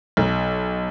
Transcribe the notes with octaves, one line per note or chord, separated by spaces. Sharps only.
B1